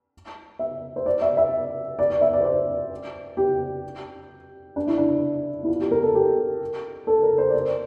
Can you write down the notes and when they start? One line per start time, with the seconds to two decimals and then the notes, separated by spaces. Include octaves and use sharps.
0.59 E5
0.96 C5
1.06 D5
1.22 E5
1.37 E5
1.99 D5
2.10 D5
2.21 E5
2.33 D5
2.41 C5
2.45 D5
3.37 G4
4.76 D4
4.87 E4
4.98 D4
5.63 E4
5.68 F4
5.80 G4
5.91 A#4
6.03 A4
6.15 G4
7.07 A4
7.23 A#4
7.38 C5
7.49 D5
7.54 C5